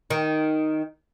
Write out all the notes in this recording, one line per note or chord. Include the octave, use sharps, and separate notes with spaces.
D#3 D#4